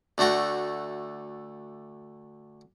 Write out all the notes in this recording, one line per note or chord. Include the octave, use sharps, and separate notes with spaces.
D2 D3 A3 F#4 G5